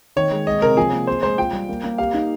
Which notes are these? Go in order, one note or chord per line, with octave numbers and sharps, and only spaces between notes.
D#3 C#5
G#3
G#3 D#5
C3 A#4
F3 G#4
A#3
G#4 C5
G#3 C5
F4 G5
G3
A#3
A#3
G4 F5
D#4